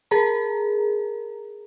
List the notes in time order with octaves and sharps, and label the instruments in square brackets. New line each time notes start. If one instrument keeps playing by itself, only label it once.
[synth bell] G#4 A#4 A#5